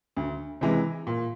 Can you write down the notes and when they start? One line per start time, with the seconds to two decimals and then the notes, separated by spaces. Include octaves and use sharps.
0.17 D2
0.61 C3 E3 G#3
1.07 A#2